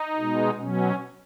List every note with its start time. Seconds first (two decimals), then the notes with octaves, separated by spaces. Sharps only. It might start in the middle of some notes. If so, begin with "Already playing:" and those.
Already playing: D#4
0.17 B2 G#3
0.59 B2 F#3 C#4